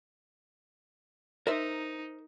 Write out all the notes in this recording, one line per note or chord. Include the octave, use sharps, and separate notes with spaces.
D#4 A#4 C5 E5